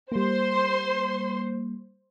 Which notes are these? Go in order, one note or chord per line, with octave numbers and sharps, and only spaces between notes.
G3 A#3 C5 C6